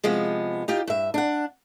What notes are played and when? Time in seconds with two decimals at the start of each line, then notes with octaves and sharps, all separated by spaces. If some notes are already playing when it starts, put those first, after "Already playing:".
0.04 C3 F3 G#3 B3
0.68 D#4 F4 G4
0.87 G2 E5
1.14 D4 F#5